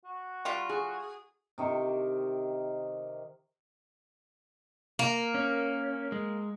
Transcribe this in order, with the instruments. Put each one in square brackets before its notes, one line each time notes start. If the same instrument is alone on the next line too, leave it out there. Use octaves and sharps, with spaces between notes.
[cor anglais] F#4
[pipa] G3 F4
[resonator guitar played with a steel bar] G#4
[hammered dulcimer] C3 D#3 C#6
[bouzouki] A#3
[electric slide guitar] C#4
G#3